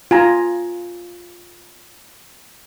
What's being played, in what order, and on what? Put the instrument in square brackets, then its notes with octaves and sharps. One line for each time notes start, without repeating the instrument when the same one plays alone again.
[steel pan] F4 G#5 A#5